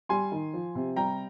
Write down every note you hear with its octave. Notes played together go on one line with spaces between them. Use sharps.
G3 G#5 C6
D#3
F3
C3
G3 G5 A#5